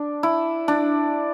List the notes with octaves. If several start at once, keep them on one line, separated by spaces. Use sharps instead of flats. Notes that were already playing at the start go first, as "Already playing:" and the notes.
Already playing: D4
E4
D4